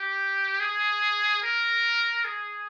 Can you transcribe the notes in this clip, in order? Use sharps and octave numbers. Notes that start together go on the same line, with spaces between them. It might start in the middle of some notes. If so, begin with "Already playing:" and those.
Already playing: G4
G#4
A#4
G#4